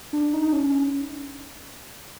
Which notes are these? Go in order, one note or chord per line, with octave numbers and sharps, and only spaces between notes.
D4
D#4
C#4